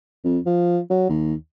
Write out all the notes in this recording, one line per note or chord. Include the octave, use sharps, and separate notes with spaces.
F2
F3
F#3
D#2